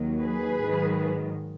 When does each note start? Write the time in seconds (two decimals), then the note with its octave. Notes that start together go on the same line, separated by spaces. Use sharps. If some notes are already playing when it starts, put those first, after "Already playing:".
Already playing: D#2 D#3 F#3
0.20 G#4 B4
0.60 G#2 D#3 F#3